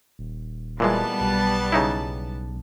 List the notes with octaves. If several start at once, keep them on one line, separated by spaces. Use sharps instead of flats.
D#1
A#2 E3 G3 G#3 B3 A5
B1
C#3 D#4 E4